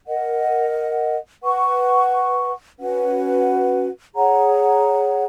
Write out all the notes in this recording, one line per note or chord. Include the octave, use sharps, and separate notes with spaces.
A#4 D#5 F#5
B4 F#5 C#6
C#4 F#4 B4 F#5
G#4 C#5 F#5 A#5